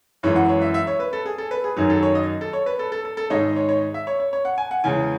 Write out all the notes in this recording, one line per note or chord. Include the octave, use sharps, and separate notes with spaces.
F#2 E3 G#3 C#5
F#5
C#5
E5
E5
C#5
B4
A4
G#4
A4
B4
G#4
F#2 D#3 F#3 G#4
A4
C#5
D#5
A4
C#5
B4
A4
A4
A4
A4
G#2 D#3 G#3 D#4 C#5
C#5
C#5
E5
C#5
C#5
C#5
F#5
G#5
F#5
E2 C#3 G#3 C#4 G#5